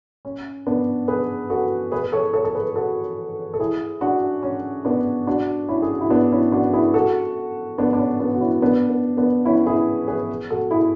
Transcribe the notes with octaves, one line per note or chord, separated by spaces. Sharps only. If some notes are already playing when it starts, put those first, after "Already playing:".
C#4
B3 D4
G#4 B4
F#4 A4
G#4 B4
A4 C#5
A4 C#5
A4
G#4 B4
F#4 A4
A4
E4 G#4
D4 F#4
C#4
B3 D4
D4 F#4
C#4 E4
G#4
F#4
E4
B3 D4
C#4 E4
D4 F#4
E4 G#4
F#4 A4
B3 D4
D4
C#4
B3 D4
F#4
C#4 E4
B3 D4
B3
B3 D4
C#4 E4
E4 G#4
G#4 B4
F#4 A4
E4 G#4